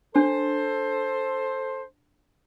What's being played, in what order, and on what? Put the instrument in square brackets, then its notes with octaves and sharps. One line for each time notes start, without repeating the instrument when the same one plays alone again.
[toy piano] D4 [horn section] A4 C5